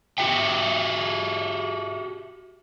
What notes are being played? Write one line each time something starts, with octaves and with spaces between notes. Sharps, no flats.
F#4 G4 E5 G5